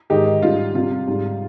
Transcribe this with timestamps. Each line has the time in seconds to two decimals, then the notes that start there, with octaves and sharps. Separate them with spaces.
0.10 G#2 D#3 G#3 D#4 G4
0.42 G#2 G3 F4
0.75 C3 G3 F4
1.07 G#2 G3